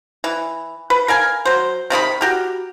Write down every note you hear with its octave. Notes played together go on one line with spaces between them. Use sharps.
E3
B4
A#4 F5 G#5
F#3 C5
C3 D#3 C4 B5
F#4 G4 A#4